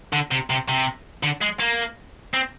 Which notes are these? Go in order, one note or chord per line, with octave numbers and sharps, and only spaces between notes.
D3
C3
C3
C3
D3
G#3
A#3
C4